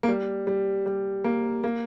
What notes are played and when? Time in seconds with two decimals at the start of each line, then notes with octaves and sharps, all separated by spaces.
0.03 A#3
0.08 G3
0.47 G3
0.86 G3
1.24 A#3
1.64 A#3